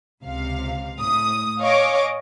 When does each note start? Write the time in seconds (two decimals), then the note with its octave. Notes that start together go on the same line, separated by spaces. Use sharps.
0.23 C#2 C3 F5
0.99 A2 D#6
1.61 C#5 D#5 F5 G#5 C#6 D6